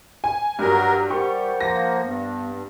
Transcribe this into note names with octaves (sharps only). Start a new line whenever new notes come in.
G#5
G2 F#3 A#4
G3 G4 A#4 C5 F#5 C#6
F3 A#3 A#6
G2 B3